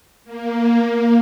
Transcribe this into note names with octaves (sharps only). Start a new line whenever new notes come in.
A#3